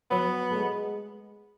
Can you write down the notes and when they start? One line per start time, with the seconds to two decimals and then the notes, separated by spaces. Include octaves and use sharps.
0.11 F#3 B3
0.51 A3
0.56 G#3